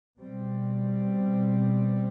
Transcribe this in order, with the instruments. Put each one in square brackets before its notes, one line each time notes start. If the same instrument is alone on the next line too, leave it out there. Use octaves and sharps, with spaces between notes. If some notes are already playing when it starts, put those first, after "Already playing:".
[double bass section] B2 G3 C4